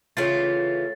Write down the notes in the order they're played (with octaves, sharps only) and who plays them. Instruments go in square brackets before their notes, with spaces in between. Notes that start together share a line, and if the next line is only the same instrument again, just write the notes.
[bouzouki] C#3 E3 F4 [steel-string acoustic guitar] A3 C#5 G5 [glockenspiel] A6